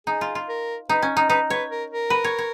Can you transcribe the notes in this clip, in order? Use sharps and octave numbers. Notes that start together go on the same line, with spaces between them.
D#4 G#4
F4
F4
A#4
D#4 B4
C#4
D#4
D#4 B4
B4 C#5
A#4
A#4
B4
C#5
C#5